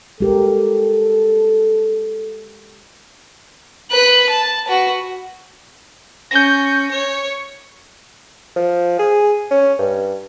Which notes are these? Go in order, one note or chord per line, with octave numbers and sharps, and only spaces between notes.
G#3 G4 A4 A#4
B4 F#6
A5
F#4 B4
C#4 G6 A#6
C#5
F3
G#4
C#4
G2